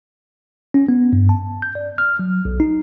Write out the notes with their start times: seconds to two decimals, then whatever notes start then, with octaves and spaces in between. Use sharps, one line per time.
0.74 C#4
0.89 B3
1.13 G2
1.29 A5
1.62 G6
1.75 D5
1.98 F6
2.19 F#3
2.45 B1
2.60 D#4